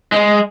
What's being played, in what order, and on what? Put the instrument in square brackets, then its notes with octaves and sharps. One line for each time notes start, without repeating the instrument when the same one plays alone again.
[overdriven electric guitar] G#3